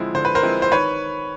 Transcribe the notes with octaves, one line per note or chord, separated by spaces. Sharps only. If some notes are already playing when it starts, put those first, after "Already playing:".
Already playing: D3 F3 G#3 C4 E4
D3 C5
B4
A#4 C5
F3 G#3 C4 E4
C5
D#3 B4 C#5